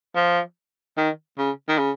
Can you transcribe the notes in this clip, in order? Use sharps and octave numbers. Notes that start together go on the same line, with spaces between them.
F3
D#3
C#3
D#3
C#3